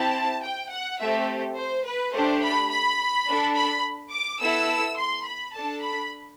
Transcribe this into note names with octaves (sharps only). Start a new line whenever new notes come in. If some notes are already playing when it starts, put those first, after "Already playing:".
Already playing: C4 E4 G4 A5
G5
F#5
A3 C4 G4 E5
C5
B4
A3 D4 G4 C5
B5
B5
D4 A4
B5
D6
B3 E4 A4 E6
C6
B5
D4 A4 A5
B5